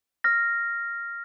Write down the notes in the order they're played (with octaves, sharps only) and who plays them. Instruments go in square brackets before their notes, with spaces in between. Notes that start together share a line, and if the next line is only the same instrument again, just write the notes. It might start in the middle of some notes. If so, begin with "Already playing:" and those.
[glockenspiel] F6 A#6